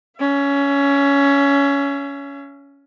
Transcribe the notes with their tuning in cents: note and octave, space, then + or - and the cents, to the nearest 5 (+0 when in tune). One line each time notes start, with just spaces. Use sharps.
C#4 +20 E5 +45